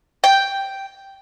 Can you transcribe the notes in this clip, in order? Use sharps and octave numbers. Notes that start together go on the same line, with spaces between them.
G5